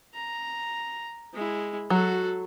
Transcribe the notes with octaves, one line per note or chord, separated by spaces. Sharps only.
A#5
G#3 E4
F#3 F#4 A4